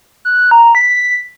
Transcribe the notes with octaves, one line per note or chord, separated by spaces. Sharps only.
F#6
A#5
B6